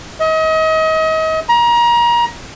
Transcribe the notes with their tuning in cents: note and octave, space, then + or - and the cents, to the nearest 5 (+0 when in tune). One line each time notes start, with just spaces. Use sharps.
D#5 +35
A#5 +30